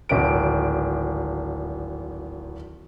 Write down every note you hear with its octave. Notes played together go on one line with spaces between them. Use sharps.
D1 G#1 D7